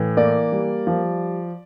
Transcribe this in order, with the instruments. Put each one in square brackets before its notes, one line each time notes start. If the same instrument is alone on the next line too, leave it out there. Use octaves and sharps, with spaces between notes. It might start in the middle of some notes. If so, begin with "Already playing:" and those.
Already playing: [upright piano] A2 E3
A#3 D5
G3
F3